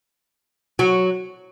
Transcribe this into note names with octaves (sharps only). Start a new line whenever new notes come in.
F#3